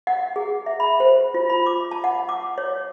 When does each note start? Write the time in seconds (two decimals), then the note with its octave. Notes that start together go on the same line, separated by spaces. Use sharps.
0.07 F#5
0.36 G#4
0.66 E5
0.80 B5
1.00 C5
1.34 F4
1.50 B5
1.66 D6
1.91 A5
2.04 F#5
2.29 D6
2.58 C#5